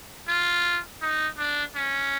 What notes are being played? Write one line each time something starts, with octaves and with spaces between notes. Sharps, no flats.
F4
D#4
D4
C#4